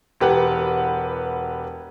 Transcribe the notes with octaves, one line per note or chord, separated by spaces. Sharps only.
E1 G4 B4 F#5